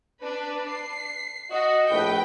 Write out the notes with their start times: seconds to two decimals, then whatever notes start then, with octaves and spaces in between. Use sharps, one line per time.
0.23 D4 B4
0.73 C7
1.52 F#4 D#5
1.91 A#1 A2 B4 G5